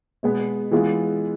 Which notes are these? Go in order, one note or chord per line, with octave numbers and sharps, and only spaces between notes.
B2 G#3 B3
E3 G#3 B3 F4